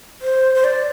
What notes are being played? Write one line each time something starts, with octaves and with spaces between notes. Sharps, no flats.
C5
C5
D5